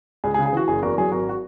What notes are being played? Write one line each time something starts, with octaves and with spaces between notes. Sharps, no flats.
C#2 G#4
G#4
C#3
G#4
E3 F#4
F#1 G#4
E2 F#4 A#4
F#3 G#4
G#1 F#4 A#4
F#4